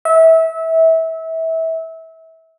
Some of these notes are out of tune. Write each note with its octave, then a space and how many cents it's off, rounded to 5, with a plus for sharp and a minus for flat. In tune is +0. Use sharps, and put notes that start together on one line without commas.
E5 -25